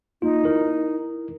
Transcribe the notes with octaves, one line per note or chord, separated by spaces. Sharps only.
A#3 D#4 F4
E4 A#4